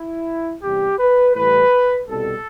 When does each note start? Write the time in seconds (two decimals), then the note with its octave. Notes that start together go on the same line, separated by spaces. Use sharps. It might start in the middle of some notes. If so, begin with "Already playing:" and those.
Already playing: E4
0.62 E2 C3 G3 G4
0.99 B4
1.35 A2 E3 G3 B4
2.08 C2 B2 G3 A4